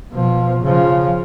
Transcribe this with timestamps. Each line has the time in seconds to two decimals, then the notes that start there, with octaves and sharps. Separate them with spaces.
0.12 B2 F3
0.62 C#3 F3